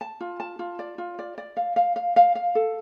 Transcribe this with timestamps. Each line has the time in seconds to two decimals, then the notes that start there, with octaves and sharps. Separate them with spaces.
0.01 A5
0.21 F4
0.40 A5
0.59 F4
0.79 D5
0.98 F4
1.19 D5
1.38 D5
1.57 F5
1.76 F5
1.96 F5
2.16 F5
2.35 F5
2.55 A4